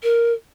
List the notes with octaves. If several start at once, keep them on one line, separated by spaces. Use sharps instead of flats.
A#4